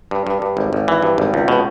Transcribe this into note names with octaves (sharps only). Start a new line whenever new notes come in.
G2
G2
G2
G#1
G#1
E3
G2
G#1
C#2
B2